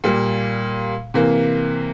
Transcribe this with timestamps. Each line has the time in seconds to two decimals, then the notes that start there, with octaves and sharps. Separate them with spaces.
0.04 A#2 G3 A#3
1.14 C3 E3 A#3